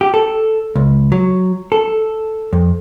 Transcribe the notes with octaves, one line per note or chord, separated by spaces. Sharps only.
G4
A4
C#2
F#3
A4
F2